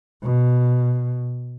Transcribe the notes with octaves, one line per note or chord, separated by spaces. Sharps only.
B2